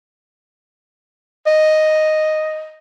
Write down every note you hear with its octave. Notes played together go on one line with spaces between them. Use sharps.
D#5